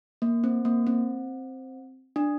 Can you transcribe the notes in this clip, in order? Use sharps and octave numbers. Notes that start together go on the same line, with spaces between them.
A#3
C4
A#3
C4
D4